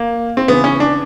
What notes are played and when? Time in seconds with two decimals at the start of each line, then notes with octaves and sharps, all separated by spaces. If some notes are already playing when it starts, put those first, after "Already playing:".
Already playing: A#3
0.37 C4
0.48 C#3 E3 B3
0.64 C#4
0.80 D4